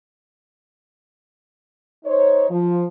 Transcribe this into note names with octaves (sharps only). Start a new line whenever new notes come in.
D#4 C5 C#5
F3